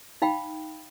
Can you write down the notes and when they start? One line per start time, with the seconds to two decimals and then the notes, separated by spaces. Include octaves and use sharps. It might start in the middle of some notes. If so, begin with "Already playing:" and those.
0.22 D#4 F5 G5 B5